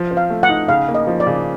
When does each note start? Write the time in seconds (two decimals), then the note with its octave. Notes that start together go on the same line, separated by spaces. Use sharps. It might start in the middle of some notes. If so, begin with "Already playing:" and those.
Already playing: F3
0.11 C4
0.17 F5
0.30 A3
0.43 F#5
0.49 D#4
0.68 C#3 F5
0.88 A#3
0.95 D#5
1.07 F3
1.20 D5
1.27 C#3